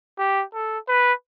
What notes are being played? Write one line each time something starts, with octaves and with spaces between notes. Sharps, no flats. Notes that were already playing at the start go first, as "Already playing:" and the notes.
G4
A4
B4